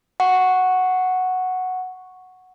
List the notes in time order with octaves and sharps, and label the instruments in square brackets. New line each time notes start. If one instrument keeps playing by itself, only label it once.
[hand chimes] F#5 C#6